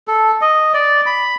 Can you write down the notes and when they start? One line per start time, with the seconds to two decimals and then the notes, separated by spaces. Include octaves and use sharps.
0.08 A4
0.41 D#5
0.74 D5
1.06 B5